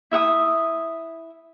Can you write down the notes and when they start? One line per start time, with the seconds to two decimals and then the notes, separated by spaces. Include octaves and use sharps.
0.11 E4 E5 F#5 D#6